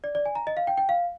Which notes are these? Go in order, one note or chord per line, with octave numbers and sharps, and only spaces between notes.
D5
D5
G#5
A#5
D#5
F5
G5
G5
F5